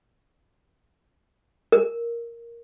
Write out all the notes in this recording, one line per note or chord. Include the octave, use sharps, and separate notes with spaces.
A#4